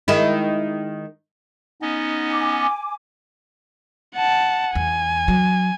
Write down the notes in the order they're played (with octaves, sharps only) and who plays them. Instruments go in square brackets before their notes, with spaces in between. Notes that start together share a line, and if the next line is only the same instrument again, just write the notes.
[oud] D#3 G#3 E4
[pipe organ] B3 C#4 D#5 [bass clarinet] D#4
[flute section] G#5 D6
[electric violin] F#5 A5
[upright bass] E2 [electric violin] G#5
[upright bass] F#3